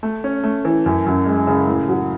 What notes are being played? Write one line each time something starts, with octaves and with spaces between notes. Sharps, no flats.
A3
C#4
A3
E3
F#2
F#2
G#3
C#3
A2
F#3